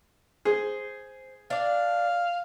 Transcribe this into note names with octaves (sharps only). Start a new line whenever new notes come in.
G#4 C5
D4 D5 F5